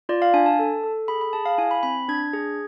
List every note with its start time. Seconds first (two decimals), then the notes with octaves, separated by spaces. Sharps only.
0.09 F4 D5
0.22 F5
0.34 D4 G#5
0.46 A5
0.59 A4
0.84 A4
1.08 G#4 B5
1.21 B5
1.33 G#4 A5
1.46 F5
1.58 E4 G#5
1.71 B5
1.83 C4 B5
2.08 D4 G#6
2.33 G#4